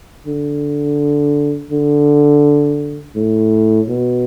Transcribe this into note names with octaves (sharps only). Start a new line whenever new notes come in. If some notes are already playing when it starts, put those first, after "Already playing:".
D3
D3
A2
B2